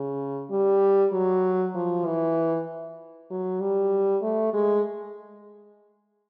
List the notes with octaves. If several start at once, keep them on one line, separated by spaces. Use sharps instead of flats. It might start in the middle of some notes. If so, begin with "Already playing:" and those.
Already playing: C#3
G3
F#3
F3
E3
F#3
G3
A3
G#3